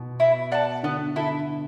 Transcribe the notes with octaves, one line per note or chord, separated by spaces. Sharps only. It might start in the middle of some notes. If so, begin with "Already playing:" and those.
Already playing: B2
E4
D5 F#5 A5
D3 B3
D3 E4 A4